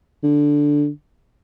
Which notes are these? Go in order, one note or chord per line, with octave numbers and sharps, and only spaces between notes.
D3